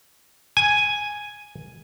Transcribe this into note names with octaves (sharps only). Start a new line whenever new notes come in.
G#5